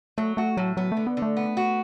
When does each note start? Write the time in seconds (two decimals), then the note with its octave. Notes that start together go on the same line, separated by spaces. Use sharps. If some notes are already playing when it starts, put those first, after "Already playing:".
0.18 F#3 A3
0.37 A3 F#4
0.57 A2 F#3
0.77 F#3 B3
0.92 D3 A3
1.07 B3
1.17 D3
1.22 A3
1.37 B3
1.57 F#4